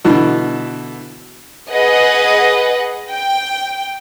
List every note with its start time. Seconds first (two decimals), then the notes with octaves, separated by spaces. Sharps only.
0.05 B2 D3 E3
1.70 G#4 B4 D#5 F#5
3.11 G5